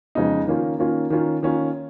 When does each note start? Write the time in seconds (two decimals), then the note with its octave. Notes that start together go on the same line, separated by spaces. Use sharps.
0.15 F2 C#3 G#3 B3 D#4
0.47 D#3 A#3 C#4 F4
0.79 D#3 A#3 C#4 F4
1.10 D#3 A#3 C#4 F4
1.43 D#3 A#3 C#4 F4